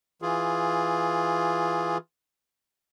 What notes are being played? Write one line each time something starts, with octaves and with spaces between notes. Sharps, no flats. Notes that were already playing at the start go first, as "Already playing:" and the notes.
E3 F4 G#4